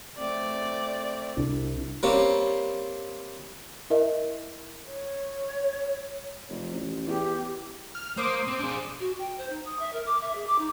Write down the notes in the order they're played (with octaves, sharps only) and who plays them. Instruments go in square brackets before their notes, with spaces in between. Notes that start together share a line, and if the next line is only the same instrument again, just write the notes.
[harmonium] A3 C4 [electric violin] D5
[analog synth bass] C2 [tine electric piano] D4 E4
[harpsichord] G3 A#3 C4 C#4
[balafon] E4 A#4 D#5 E5
[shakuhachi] C#5
[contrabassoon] F1
A1
[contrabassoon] E2 [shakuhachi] G4
[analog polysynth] F6
[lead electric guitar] A#3 [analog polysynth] C5 D6 D#6
[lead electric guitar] C4
D4 G#4
[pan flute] F#4
G5
C5
D#4
D#6
E5
A#4
D6
E5
G#4
D6
D#4